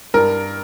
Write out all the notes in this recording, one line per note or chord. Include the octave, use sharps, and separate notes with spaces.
G2 A#4